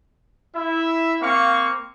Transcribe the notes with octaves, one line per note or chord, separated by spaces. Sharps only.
E4 E5
A#3 C4 F5 C#6